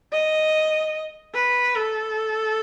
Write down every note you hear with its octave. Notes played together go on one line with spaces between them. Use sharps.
D#5
B4
A4